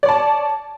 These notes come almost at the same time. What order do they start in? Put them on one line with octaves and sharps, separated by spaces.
D5 C#5 A5